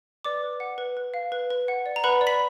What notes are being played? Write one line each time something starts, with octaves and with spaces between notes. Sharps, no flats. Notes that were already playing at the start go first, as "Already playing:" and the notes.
B4 D5 D6
B4
F#5
B4
B4
F5
B4
B4
F#5
D5
A#5
B4 F#5 B5
D5
B5 B6